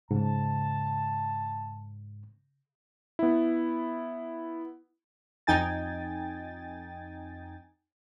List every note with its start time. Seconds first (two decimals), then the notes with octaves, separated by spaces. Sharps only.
0.11 G#2 C#3 C#4 A5
3.19 B3 E4
5.47 F2 D#4 G5 G#5 A6